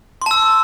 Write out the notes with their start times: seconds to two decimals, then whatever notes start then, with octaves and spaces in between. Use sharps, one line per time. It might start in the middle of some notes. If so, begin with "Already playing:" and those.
0.22 C6
0.26 A5
0.31 E6